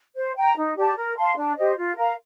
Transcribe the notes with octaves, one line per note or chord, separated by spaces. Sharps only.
C5
G5 A#5
D#4
G4 D5 A5
A#4
F5 A5 C6
D4
G4 C5 D#5
F4
A#4 F5 A#5